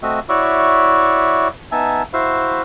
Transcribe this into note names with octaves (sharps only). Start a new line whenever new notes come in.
A3 C4 F#4 D#5 E5
E4 F#4 C#5 D5 E5
B3 D#4 E5 G#5 A5
E4 F#4 C5 E5 F5